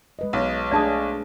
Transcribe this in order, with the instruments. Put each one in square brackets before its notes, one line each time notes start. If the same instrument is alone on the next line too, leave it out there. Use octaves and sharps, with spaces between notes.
[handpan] G#3 B4 D#5
[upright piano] B1 [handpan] C#5
[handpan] A3 D4 G#4 [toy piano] D5 A5 D#6